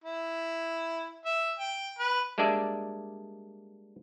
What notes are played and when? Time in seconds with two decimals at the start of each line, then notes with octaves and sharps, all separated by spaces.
0.04 E4
1.25 E5
1.59 G5
1.99 B4
2.38 G3 G#3 A#3 D4 D5 E5